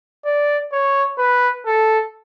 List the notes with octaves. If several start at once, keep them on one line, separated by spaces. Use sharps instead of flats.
D5
C#5
B4
A4